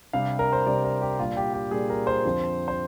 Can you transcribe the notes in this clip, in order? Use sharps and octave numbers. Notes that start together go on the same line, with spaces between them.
C3 G3 D4 F5
A#4
C5
C3 G3 D4 D5
A#4
G4
A#2 G3 D4 F4
G4
G4
A#2 G3 D4 G#4
A#4
C5
F2 D3 F3 C4
C5